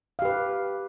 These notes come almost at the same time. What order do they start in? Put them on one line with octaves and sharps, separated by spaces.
F5 G4 B4